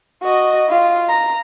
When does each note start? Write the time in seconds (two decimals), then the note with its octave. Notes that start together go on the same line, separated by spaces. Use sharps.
0.23 F#4 D#5
0.69 F4
1.09 A#5